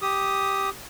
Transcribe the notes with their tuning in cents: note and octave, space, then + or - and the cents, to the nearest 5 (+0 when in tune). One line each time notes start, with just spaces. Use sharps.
G4 +0 D#6 +5